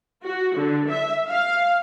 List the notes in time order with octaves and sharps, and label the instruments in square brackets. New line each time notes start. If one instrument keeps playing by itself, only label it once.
[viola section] F#4
D3
E5
F5